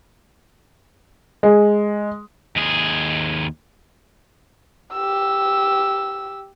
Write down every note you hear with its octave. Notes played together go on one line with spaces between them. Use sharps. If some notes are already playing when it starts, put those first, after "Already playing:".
G#3
D#2 G#4
G4 E6